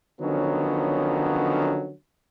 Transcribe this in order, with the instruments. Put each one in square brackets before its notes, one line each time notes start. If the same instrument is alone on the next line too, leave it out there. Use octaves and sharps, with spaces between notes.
[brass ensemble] D3 D#3 F3 F#3 B3 C#4